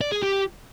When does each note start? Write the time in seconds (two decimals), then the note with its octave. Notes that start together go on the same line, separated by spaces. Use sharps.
0.01 D5
0.12 G#4
0.23 G4